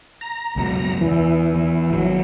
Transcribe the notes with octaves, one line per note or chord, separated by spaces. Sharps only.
A#5
C#2 F#2 B2
E2 E3
E2
G#1 C#3 F#3